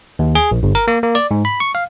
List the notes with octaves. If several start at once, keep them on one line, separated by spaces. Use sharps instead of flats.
D#2
G#4
A#1
G1
A#4
A#3
A#3
D5
G#2
B5
C#6
F5